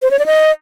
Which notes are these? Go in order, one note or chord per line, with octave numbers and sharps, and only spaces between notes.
C5
C#5
D5
D#5